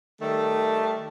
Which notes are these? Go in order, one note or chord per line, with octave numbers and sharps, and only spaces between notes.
D#3 G3 A3